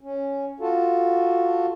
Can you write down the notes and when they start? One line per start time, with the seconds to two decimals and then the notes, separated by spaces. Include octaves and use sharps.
0.01 C#4
0.60 F4 F#4 A4